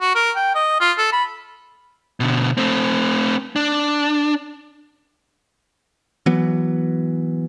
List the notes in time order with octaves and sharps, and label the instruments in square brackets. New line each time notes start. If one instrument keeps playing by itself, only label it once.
[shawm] F#4
A#4
G5
D#5
F4
A4
B5
[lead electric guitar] B2 D3
A3 C4
D4
[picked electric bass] E3 F#3 B3